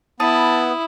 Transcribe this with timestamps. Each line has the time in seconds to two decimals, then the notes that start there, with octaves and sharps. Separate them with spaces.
0.20 B3 E4 A5 D#6